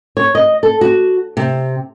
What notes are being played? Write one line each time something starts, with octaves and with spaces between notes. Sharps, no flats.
C#5
D#5
A4
F#4
C3